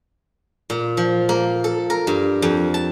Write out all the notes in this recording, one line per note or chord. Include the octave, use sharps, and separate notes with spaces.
A#2
F3
A#3
A4
A#4
G2
F2
A5